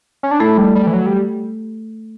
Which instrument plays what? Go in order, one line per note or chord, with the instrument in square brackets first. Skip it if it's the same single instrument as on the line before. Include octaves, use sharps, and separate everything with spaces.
[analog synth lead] C#4
D4
[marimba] A3 A4 [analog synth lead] E4
[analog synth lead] G3
G3
E3
F#3
G3